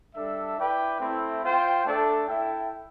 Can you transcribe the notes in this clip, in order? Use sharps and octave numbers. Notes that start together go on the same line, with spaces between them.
G3 D4 A4 E5
E4 B4 D5 G5
A3 C4 E4
F4 C5 G5
A3 D4 A4 D5
E4 A4 E5 G5